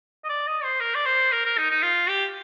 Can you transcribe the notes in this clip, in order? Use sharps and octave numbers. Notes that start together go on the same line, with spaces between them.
D#5
D5
D#5
C5
A#4
D5
C5
A#4
A#4
D#4
D#4
F4
G4